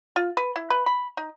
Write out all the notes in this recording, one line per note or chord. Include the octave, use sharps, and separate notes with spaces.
F4
B4
E4
B4
B5
D#4